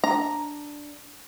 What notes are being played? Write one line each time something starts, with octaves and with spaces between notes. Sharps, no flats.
D4 A#5